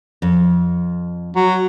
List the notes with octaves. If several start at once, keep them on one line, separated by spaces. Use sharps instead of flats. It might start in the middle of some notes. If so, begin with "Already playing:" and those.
F2
F#3